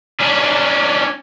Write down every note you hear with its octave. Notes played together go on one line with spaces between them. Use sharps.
C#4 D4